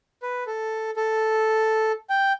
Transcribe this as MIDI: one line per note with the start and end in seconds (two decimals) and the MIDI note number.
0.22 0.44 71
0.47 0.91 69
0.96 1.92 69
2.10 2.33 79